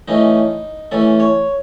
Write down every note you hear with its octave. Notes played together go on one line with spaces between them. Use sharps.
E3 A3 C#4 D#4
E3 A3 C#4 A4
C#5